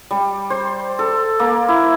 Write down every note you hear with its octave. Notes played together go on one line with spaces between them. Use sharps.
G3
C5
A4
A#3
E4